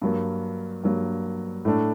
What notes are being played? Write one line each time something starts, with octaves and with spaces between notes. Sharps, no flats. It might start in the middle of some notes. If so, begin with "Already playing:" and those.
G2 F#3 A#3
G2 F#3 A#3
A2 A3 D4